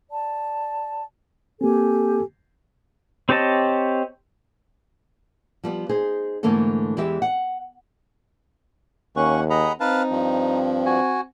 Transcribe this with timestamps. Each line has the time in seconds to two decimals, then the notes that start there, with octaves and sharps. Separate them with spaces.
0.11 D5 A5
1.61 A#3 C4 G4 A4 G#5
3.29 C4 G4 C#5 D#5 A5
5.64 F3 G3 B3
5.89 D#4 G#4 C5
6.43 G#2 D3 E3 A3 A#3 A4
6.97 E2 E3 G#3 G4 E5
7.22 F#5
9.16 D#2 A#3 C#4 F#5 C#6
9.50 G#4 D#5 F#5 A#5 B5
9.80 C4 D#4 B4 F5 A5
10.10 G2 F3
10.86 F#4 G#5